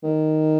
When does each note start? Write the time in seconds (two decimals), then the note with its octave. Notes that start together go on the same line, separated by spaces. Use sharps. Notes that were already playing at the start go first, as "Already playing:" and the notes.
0.04 D#3